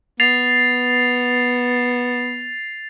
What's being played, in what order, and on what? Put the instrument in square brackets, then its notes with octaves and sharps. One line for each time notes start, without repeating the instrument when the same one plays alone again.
[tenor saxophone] B3 [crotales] A6 C7 F7